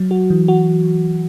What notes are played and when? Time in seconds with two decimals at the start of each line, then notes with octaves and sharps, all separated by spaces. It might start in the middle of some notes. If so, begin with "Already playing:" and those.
Already playing: F#3
0.11 F#4
0.30 E3
0.48 F#4